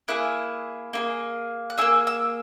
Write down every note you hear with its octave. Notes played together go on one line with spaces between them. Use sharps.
A#3 E4 G#4 F#6
A#3 E4 G#4
F#6
A#3 E4 G#4 E6
E6